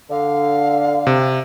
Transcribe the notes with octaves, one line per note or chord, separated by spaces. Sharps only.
D3 F5
C3